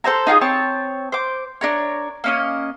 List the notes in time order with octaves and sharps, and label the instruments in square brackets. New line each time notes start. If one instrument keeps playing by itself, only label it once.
[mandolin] A4 C5 E5 A#5
D#4 F4 F#4 G#4
C4 C#5 A5
C5 D6
D4 A#4 C#5
A#3 C#4 D#5